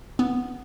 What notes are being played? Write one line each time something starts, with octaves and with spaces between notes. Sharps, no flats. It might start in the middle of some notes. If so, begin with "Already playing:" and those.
B3